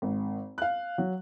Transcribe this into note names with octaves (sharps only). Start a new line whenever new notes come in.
G#1
F5 F#6
F#3